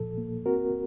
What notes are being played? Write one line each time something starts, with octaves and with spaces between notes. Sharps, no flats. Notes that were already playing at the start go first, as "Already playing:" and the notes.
Already playing: A#2 F3 A4
A#3
C4 F#4 A#4